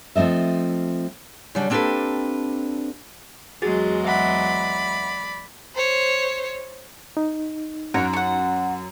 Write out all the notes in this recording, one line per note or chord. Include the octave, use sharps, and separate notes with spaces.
F3 A3 C4 D#5 E5
C#3 F#3 G3 D4
A#3 C4 D4 G4 A4 B4
E2 F#3 G#3 F#4 G#4 A6
D5 E5 F#5 B5
C5 C#5
D#4
F#2 A#4 C#5 F#5
F#5 C#6